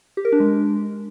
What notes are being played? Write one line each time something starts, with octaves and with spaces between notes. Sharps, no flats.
G4
A#4
D4
G#3